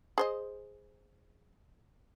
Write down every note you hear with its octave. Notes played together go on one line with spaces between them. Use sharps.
G#4 C5 D#5